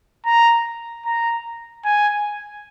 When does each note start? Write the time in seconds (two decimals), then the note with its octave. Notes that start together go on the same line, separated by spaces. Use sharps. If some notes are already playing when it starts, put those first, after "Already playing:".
0.25 A#5
1.06 A#5
1.85 G#5